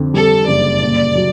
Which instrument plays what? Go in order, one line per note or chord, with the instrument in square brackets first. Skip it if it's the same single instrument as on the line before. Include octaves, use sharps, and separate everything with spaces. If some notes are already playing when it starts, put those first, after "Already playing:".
Already playing: [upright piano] F2 D3
[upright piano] G3 [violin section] A4
[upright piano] F#1 [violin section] D5
[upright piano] A#2
F#3